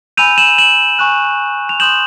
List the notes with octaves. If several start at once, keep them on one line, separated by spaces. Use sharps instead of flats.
G#5 B5 E6 G6 D#7 F7
E7 F#7
E7 F#7
G#5 C#6 F#6
F7
C6 D#6 G6 E7 F#7